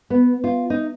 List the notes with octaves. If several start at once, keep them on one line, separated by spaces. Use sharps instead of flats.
B3
F4
D#4